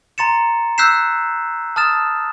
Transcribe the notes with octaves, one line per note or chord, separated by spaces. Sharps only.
A#5 C6 A6 C#7 E7
E6 F#6 G6 B6 C7 E7
A5 D#6 F6 A6 E7